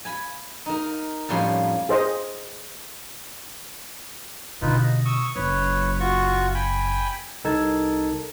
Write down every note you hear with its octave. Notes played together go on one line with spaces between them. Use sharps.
G#5 B5
D#4 A#4
F2 A2 G3 A#3 C#4 C6
G#4 C5 D#5
B2 D3 D#4 F4 B4
D#5
C#6 D#6 E6
F#1 B4 C#5
F4 F#4 C#6
G5 G#5 B5
C2 D#4 A4 A#4 A5 G#6